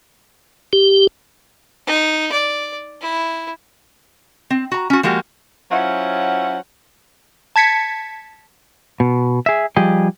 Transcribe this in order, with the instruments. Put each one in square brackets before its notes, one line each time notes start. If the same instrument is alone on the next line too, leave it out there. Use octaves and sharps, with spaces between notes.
[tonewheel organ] G4
[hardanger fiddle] D#4
D5
E4
[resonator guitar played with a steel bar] C4
F#4 A#5
C#4 F#4
F3 G#3 A#3 F#4 G4
[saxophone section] F#3 C#4 E4 F4 C5 F#5
[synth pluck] A5 G#6 B6 C#7
[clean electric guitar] B2
G#4 E5
F3 G3 G4 G#4 D#5